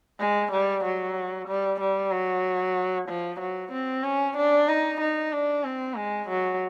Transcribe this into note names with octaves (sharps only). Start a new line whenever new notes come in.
G#3
G3
F#3
G3
G3
F#3
F3
F#3
C4
C#4
D4
D#4
D#4
D4
C4
G#3
F#3